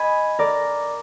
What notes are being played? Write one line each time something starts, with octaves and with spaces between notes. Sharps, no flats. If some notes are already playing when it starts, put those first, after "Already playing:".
Already playing: D#5 G#5 B5
A#4 D5